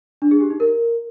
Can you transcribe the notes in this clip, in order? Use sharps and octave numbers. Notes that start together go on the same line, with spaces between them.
D4
G#4
G4
D#4
A#4